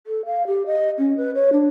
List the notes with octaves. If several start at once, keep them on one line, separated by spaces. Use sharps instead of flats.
A4
F5
G4
D#5
C#4
B4
C#5
D4